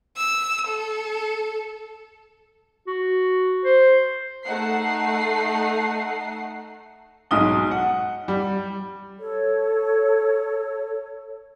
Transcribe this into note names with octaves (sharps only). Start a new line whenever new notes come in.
E6
A4
F#4
C5
A3 D#4 F#5 C7
B1 G#2 G#3 D#6 G7
F#5
G3
A4 C#5